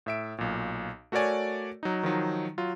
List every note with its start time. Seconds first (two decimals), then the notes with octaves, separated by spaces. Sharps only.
0.06 A2 E5 D7
0.38 B1 A#2
1.12 A3 F#4 A#4 C#5 D5 G#5
1.83 F#3 D#4
2.03 D#3 F3 F#3 D#4
2.58 F#3 F4